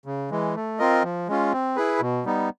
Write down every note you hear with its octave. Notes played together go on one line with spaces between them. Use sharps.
C#3
E3 G#3
A3
C4 F4 A#4 D#5
F3
G#3 C#4 F4
C4
E4 G#4 B4
B2
G3 B3 D#4